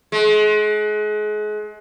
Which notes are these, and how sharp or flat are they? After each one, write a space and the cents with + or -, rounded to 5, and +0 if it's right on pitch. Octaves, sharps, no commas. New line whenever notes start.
G#3 +35